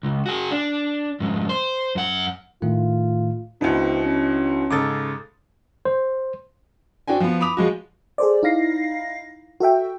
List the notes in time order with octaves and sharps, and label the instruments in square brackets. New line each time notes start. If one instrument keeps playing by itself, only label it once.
[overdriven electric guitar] C#2
F#4 G#4
D4
F2 G#2
C5
F#2 F#5
[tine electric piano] A2 D#3 A3 [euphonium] F4
[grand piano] C#2 B2 [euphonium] C4 [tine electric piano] D4 E4 F#4
[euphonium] C#4
[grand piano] G#2 C#3 A4 [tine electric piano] D6 D#6 A6
[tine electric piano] C5
[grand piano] C4 D4 F#4 G5 G#5
F3 B3
B5 D6 D#6 F7
F3 G#3 F#4
[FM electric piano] G#4 A4 C5 D5
D#4 E4 F5 A#6 C7
F#4 A4 E5 G5